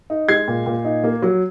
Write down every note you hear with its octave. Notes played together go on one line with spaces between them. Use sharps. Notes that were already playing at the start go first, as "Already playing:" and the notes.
D#4
G#3 G#6 C7
A#2
A#2
D#4
A#3
F#3